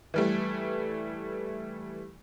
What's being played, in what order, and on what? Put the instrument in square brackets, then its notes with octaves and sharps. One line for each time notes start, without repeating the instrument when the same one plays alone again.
[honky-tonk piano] E3 G3 A3